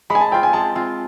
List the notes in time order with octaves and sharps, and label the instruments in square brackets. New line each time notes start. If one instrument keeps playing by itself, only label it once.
[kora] G#3 [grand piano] B5
[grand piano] G#5
A5
[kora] C4 F4 [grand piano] G5
[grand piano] G#5
[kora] G#3 [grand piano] A5
[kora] C4 F4